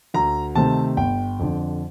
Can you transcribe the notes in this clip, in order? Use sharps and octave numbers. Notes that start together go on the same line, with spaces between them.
D2 A#5
C3 D#3 A3 C4 A5
G1 G5
F2 D3